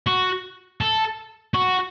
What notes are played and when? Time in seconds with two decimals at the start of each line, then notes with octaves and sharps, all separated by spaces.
0.07 F#4
0.81 A4
1.54 F#4